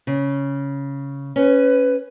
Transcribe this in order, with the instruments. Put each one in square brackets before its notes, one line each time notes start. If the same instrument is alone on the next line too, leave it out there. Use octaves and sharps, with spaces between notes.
[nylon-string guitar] C#3
[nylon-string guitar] C#4 [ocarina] B4